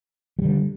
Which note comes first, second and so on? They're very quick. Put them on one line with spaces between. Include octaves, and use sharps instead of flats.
F#3 G3 D3